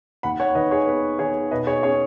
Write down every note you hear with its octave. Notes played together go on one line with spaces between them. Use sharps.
D#2 F#5 B5
C#5 F#5
D#3 B4 D#5
G#4 C#5
B3 B4
D#3 G#4 C#5
B2 B4 D#5
G#4 C#5
C#4 G#4 C#5